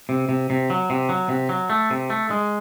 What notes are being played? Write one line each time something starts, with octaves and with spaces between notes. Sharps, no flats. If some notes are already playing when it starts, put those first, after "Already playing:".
C3
C3
C3
F#3
C3
F#3
C3
F#3
A3
C3
A3
G#3